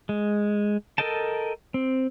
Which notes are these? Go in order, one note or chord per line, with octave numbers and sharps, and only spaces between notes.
G#3
A4 A#4 D#5 G5 A5
C4